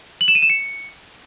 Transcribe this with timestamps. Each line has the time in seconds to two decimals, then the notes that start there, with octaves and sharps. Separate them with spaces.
0.21 F#7
0.28 E7
0.35 D#7
0.42 E7
0.50 C#7